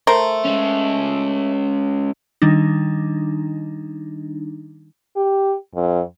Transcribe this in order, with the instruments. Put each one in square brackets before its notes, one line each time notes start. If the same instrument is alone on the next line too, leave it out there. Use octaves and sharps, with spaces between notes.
[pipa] A3 A#4 C5
[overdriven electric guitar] G#3 C#4
[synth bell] D#3 G3 D4 D#4
[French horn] G4
F2